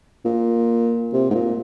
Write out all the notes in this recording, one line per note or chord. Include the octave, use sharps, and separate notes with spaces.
A#2
C3
G#2
A#2